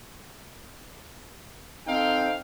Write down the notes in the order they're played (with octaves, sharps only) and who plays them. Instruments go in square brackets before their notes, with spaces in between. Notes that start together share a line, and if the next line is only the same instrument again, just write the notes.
[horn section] C4 D#4 A4 F5 G5